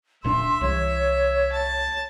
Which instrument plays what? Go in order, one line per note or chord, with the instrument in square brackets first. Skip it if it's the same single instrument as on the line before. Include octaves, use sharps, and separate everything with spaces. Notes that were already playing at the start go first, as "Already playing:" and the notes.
[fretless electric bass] D1 A#2 D4 [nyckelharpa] E5 [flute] C6
[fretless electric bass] C2 E3 [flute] C#5
[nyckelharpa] A5